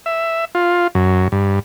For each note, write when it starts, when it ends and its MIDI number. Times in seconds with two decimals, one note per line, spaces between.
0.06 0.45 76
0.55 0.87 65
0.95 1.28 42
1.32 1.60 43